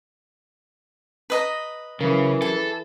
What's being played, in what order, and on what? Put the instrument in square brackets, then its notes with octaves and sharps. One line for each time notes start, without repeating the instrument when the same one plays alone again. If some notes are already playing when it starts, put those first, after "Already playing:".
[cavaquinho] B4 D#5 A#5
[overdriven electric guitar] C#3 [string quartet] E3 [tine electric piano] F#3 C#4 A#4
[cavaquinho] G#4 [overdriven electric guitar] A4